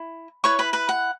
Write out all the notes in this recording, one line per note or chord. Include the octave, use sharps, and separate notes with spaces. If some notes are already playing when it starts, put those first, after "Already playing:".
Already playing: E4
E4 B4 C#5 C#6
B4 B5
B4 B5
F#5